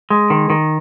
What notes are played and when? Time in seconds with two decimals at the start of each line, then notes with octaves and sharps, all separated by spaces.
0.10 G#3
0.30 D#3
0.50 D#3